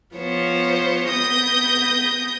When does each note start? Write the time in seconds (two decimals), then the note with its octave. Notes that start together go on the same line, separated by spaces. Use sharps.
0.16 F3 B3 C5 C#5
1.10 B3 D#6 G6 A#6